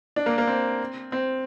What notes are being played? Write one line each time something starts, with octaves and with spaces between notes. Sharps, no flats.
D4
A#3
A#3
C4
C4